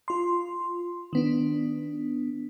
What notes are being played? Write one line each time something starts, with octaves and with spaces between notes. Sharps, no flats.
F4 C6
D#3 B3 D4